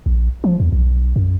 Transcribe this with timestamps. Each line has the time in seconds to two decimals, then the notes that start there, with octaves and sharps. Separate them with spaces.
0.06 A#1
0.44 F3
0.60 E2
0.72 B1
1.16 F#2